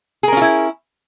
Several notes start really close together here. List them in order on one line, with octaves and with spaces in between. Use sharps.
G#4 A#4 C#4 F4 E4